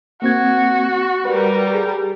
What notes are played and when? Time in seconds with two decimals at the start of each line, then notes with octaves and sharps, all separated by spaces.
0.22 A#3 C4 F#4 G#6
1.25 G3 A#4 B4
1.74 G#4